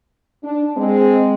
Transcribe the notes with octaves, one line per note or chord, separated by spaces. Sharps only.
D4
G#3 C4